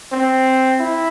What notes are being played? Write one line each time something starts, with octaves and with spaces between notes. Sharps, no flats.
C4
E4